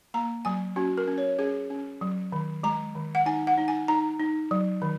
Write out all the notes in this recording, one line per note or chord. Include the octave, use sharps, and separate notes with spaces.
A#3 A#5
F#3 G#5
C#4 F#4
A#4
C#4
C#5
C#4 G#4
C#4
F#3
D#3
G#3 A#5
D#3
F#5
D#4 G#5
F#5
D#4
G#5
D#4 A#5
D#4
F#3
D#3